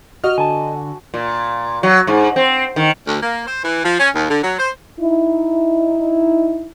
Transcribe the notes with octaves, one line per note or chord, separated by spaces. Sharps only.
F#4 D#5 F6
D3 G#5 A5
A#2
F#3
G#2
C4
D#3
D2
A#3
C5
E3
F3
C#4
D#2
D3
F#3
C5
D#4 E4